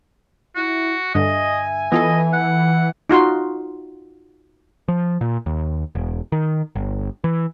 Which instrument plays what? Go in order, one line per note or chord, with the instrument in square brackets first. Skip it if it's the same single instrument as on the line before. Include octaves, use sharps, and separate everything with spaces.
[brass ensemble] E4 [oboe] F#4
[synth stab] G2 D3 [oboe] D#5 [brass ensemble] E5 G#5
[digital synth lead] E3 [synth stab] B3 F4 A4 [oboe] D#5
[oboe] F#5
[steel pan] D#4 F4 F#4 C6
[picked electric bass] F3
A#2
D#2
E1
D#3
G1
E3